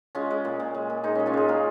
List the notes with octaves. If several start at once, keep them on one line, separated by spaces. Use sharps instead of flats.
G#3 C#4 F4
G#3
A#2
A#2
G#3
A#2
G#3 D#4
A#2 C#4
C#4 F4
G#3 D#4 G#4
A#2 F4 A#4